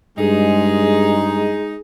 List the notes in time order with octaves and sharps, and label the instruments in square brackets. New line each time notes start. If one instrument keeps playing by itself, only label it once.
[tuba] G2 [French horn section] G#3 [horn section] D#4 [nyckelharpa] G#4